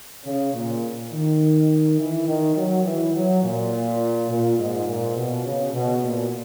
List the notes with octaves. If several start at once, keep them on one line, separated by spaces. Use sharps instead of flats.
C#3
A#2
D#3
E3
D#3
F#3
E3
F#3
A#2
A#2
G#2
A#2
B2
C#3
B2
A#2